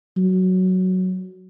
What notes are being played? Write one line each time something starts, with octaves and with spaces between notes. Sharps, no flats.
F#3